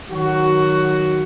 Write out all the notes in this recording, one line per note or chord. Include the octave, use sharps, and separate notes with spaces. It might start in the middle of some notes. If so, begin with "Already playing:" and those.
D#3 F#3 F#4